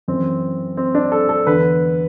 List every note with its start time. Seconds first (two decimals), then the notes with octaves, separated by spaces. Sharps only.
0.08 F#2 E3 C4
0.77 C4
0.95 D4
1.12 A4
1.29 A4
1.46 E2 D3 B4